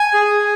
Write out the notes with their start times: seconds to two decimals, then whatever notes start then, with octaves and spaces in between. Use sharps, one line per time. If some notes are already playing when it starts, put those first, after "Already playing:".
Already playing: G#5
0.14 G#4